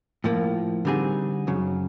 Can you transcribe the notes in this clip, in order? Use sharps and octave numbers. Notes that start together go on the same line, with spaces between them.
A2 F3 A#3
D3 G3 C4 D#4 G#4
F#2 C#3 F#3